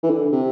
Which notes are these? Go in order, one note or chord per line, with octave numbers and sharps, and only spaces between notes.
E3
D3
C3